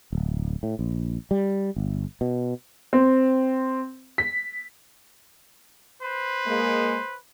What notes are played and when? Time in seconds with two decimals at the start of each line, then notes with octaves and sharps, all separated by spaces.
0.12 D1
0.63 A2
0.79 A#1
1.31 G3
1.76 G1
2.21 B2
2.93 C4
4.18 B6
6.02 B4 C5
6.46 G#3 A#3